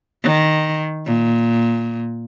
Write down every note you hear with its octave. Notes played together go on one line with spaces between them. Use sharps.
D#3
A#2